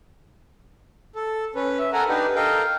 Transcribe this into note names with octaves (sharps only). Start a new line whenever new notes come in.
A4
C#4 B4
E5
A4 A#4 F#5 G#5 A#5
D4 D#4 G4 B4
A4 A#4 D#5 F5 G5